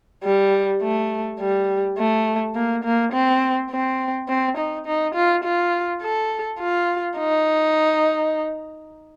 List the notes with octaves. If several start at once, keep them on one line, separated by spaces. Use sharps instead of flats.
G3
A3
G3
A3
A#3
A#3
C4
C4
C4
D#4
D#4
F4
F4
A4
F4
D#4